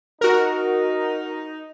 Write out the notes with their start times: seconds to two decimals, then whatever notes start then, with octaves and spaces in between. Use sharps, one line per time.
0.21 D#4 F#4 A#4